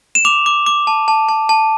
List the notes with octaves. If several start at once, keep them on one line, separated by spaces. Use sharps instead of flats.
E7
D6 F7
D6
D6
A5
A5
A5
A5